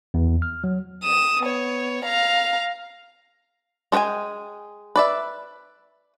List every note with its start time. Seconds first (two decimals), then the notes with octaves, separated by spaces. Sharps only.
0.14 E2
0.42 F6
0.64 F#3
1.04 D#6 E7
1.43 B3 C#5
2.05 F5 A#5
3.92 G#3 A4 B4 G5 G#5
4.96 B4 D5 E5